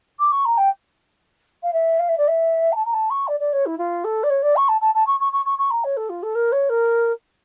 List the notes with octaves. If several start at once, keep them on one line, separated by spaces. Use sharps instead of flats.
D6
C#6
A#5
G5
F5
E5
F5
E5
D5
E5
A#5
A5
A#5
A5
C#6
D5
D5
C#5
E4
F4
A4
D5
C#5
D5
C#6
A5
A5
A5
C#6
C#6
C#6
C#6
C#6
A#5
C#5
A4
F4
A4
A#4
C#5
A#4